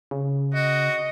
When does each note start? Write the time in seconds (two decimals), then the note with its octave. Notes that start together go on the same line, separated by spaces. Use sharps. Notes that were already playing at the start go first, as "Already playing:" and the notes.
0.11 C#3
0.54 F#4 D#5